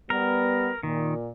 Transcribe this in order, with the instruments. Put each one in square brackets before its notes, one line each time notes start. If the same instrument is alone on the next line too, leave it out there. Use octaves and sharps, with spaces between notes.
[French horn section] G3 B3 [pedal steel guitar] A#4
[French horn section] A#2 [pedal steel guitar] D#3